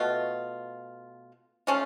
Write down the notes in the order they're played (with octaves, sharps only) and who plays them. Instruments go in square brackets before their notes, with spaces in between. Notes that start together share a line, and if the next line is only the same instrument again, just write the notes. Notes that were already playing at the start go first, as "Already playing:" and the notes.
Already playing: [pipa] B2 A3 F4
A3 C#4 F4